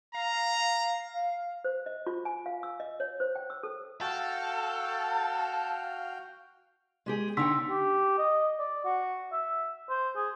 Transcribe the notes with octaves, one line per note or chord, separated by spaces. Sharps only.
F5 A#5
C5
D#5
F4
G#5
F5
E6
D#5
C#5
C5
G5
E6
A4
F#4 A4 F5 G5
G#3 G4 G#4
D3 D#4 G5 C6 E6 B6
G4
D#5
D5
F#4
E5
C5
G#4